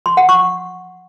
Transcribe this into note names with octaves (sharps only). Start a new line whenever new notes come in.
C6
F#5
C#6